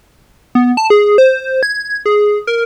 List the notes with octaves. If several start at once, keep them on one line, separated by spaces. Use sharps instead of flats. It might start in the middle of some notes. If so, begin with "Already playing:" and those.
B3
A5
G#4
C5
G#6
G#4
A#4